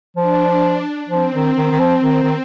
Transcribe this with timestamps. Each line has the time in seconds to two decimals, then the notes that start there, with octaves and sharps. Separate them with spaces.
0.16 F3 D4
1.09 F3 C4
1.34 D#3
1.57 D#3
1.71 D#3
1.80 F3
2.03 D#3
2.23 D#3